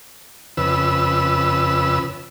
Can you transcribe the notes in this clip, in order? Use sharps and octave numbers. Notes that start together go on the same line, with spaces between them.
F2 C#3 B4 E6